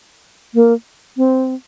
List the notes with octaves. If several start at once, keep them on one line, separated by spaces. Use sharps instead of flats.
A#3
C4